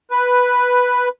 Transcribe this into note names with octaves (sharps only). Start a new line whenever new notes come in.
B4